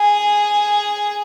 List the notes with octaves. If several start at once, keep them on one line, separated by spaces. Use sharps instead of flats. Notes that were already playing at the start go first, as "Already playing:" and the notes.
Already playing: G#4